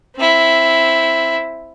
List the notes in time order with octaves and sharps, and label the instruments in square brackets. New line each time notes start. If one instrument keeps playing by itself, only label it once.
[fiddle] C4 E4